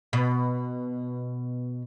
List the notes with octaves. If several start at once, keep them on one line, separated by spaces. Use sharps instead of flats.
B2